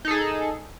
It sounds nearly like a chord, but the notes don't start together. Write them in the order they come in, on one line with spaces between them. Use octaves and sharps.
D#4 A4 G#4